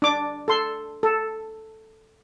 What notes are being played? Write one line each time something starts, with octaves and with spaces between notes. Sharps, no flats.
D4 D6
A4 C6
A4